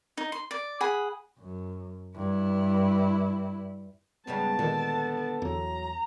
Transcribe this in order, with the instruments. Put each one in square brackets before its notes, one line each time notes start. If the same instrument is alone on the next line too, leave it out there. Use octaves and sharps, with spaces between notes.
[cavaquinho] D#4
C6
D5
G#4 F#5 B5
[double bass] F#2
G2 E4
[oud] G#2 C#3 G3 [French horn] B3 [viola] A5
[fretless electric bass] A#2 D#3 G#3 [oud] D3
[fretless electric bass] E2 [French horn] F#3 [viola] A#5